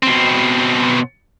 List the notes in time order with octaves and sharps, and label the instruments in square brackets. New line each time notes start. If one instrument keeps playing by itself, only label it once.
[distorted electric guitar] B2 C4